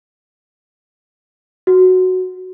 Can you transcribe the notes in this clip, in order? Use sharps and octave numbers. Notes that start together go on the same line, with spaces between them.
F#4